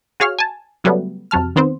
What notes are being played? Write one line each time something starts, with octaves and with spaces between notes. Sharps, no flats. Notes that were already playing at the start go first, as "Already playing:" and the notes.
F#4 G#4 C#5 F5 F6
G#5 A5
C#3 F#3 G3 A3 B3
F2 C3 F#3 A5 F6
D#3 B3 C4 C5